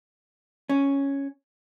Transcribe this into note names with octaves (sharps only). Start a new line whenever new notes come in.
C#4